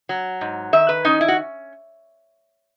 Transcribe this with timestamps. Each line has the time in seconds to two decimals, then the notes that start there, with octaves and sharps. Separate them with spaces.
0.09 F#3
0.41 G#2
0.73 D#3 E5
0.89 B4
1.05 C#4 D#4
1.21 E4
1.28 F#4